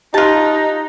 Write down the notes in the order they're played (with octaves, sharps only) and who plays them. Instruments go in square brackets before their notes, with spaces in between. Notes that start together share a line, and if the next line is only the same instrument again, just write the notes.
[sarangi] D#4 [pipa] F4 A5 [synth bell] G4 F#6